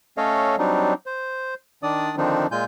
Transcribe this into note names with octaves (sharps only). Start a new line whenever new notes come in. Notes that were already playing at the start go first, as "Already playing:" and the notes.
A3 C#4 A4 C#5 D#5 F5
F#3 G3 C4 D4 D#4
C5
D#3 D4 D5 D#6
D3 D#3 F3 C4 D4 D#4
A#2 G#3 F4 G#5 G6